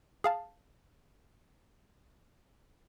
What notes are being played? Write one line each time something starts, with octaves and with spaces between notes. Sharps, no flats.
G#4 F5 A5